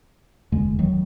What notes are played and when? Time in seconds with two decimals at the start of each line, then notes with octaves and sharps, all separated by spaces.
0.52 F1 D#2 D3 G#3
0.79 D#3 F#3